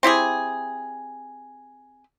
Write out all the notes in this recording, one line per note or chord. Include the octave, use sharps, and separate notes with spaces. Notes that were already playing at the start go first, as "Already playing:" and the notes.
C4 E4 G4 G#4